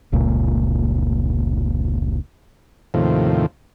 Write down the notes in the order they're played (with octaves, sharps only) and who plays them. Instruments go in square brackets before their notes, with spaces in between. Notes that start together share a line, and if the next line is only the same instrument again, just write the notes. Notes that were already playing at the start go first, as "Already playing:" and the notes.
[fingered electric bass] F1 C#2 A#2
[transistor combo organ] D#2 A2 C3 F3